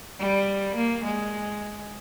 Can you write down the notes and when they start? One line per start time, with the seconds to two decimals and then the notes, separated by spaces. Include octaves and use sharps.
0.19 G3
0.76 A#3
1.04 G#3